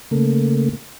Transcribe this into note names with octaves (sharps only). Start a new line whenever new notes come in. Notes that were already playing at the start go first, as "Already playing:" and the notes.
C#3 A3 A#3